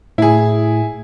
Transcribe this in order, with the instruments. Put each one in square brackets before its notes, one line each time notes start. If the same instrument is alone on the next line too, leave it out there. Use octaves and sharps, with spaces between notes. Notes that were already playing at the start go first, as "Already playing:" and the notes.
[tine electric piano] A2 [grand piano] E4 G#4